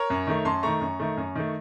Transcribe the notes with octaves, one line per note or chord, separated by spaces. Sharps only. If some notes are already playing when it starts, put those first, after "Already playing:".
Already playing: A#4 C#5
F#2
D#3 A3
F#2 A5 C6
D#3 A3 A#5 C#6
F#2
D#3 A3
F#2
D#3 A3